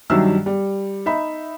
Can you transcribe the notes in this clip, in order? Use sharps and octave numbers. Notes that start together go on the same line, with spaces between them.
G2 D#3 F#3 G3 E5 E6
G3
D#4 E5 B5